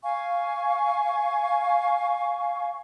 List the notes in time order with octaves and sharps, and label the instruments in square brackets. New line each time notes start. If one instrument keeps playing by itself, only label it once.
[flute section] F5 G#5 C#6